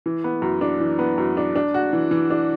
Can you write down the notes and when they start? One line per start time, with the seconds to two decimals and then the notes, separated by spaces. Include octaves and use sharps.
0.06 E3
0.24 B3
0.42 F#2
0.61 D4
0.80 E3
0.99 B3
1.18 F#2
1.37 D4
1.56 D4
1.74 F#4
1.93 E3
2.11 E3
2.30 D4